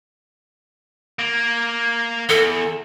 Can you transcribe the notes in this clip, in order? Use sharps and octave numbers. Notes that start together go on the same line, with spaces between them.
A#3
E2 A4